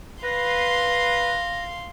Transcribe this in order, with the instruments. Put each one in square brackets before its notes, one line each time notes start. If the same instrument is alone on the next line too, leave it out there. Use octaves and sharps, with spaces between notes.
[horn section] B4 [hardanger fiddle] F5 C6 [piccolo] A#6